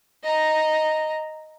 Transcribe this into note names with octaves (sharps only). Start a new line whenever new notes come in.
D#5 A#5